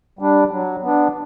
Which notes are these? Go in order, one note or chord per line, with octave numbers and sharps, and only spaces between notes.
G3 D4
F#3
B3 D4